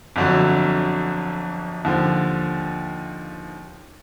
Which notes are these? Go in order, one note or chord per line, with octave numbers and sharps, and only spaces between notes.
G1 F2 D3 F#3
D#2 D3 F3